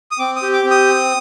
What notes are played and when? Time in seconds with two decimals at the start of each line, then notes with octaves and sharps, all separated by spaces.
0.11 D#6
0.19 C4 D6
0.36 D#6
0.42 G4
0.53 D6
0.65 C4
0.71 D#6